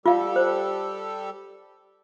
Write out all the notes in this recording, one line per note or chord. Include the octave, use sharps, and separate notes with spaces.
G3 F4 G4 A4 F5
C5